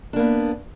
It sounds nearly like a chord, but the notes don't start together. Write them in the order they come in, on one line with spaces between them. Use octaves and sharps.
D4 A#3 B3